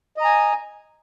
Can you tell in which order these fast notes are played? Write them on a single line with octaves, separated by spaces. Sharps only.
D#5 A#5 G#5